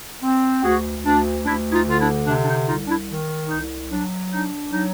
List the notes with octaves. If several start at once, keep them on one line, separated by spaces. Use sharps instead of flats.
C4
D2 F#4 G#4
D2 D4
D2 D4 E4
E4
D#4 F4
D3 F4
D4 E4
C3 D4
D4
D#4
C2 D#4 F4
D4 E4
D#3
C2 D#4
F#3 D4
D4 D#4
F#3 D#4